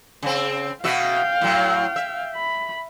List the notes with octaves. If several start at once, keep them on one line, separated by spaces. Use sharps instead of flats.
C#3 C4
B2 F#4 E5 F5 G5
A2 F#3
E5
B5